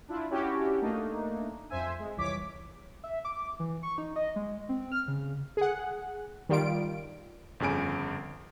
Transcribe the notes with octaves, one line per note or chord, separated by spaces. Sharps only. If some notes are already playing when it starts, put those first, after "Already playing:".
D4 E4 F4
C#4 D4 E4 F#4 G4 C#5
A3 A#3 D4 D#4
F2 C5 E5 G#5
G#3
C2 F2 E3 C#5 D6 B6
E5
D6
E3
C#6
D#4
D#5
G#3
C4
F6
C#3
G#4 F#5
D#3 G3 F4 D7
G1 F2 C#3 G#5 D7